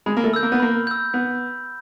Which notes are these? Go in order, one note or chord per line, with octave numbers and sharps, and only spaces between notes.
G#3 B5
A#3
A3
E6 G6
A#3
B3
A#3 B5
E6 G6
B3 B5